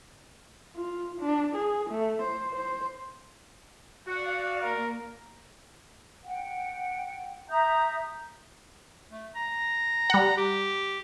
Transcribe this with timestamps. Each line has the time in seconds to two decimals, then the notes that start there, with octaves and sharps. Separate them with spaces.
0.77 F4
1.21 D4
1.56 G#4
1.90 A3
2.22 C5
2.56 C5
4.07 F#4 D5 F5 F#5
4.63 A#3 A#4
6.25 F#5 G5
7.49 E5 A#5 D#6 G6
9.11 A3
9.35 A#5
10.10 G3 F#5
10.37 G4